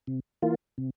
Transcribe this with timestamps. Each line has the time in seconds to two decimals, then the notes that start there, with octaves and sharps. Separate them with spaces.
0.07 C3
0.42 E3 A#3 F4
0.78 C3